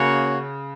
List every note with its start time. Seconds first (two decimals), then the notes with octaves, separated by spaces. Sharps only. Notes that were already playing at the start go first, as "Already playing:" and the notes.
Already playing: C#3 A#3 C#4 F#4 C#5